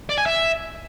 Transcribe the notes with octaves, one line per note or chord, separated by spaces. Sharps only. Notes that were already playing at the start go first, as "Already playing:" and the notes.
D5
G#5
E5